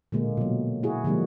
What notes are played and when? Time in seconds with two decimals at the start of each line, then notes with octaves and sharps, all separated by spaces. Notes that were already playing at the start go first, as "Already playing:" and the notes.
0.12 A#2 D3 G#3 A#3
0.37 B2 F#3
0.83 E4 F#4 G#4
1.04 D3 F3 G3 G#3 A#3 D4